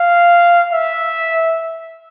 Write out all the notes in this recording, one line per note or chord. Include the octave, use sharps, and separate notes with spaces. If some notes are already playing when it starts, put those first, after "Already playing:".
Already playing: F5
E5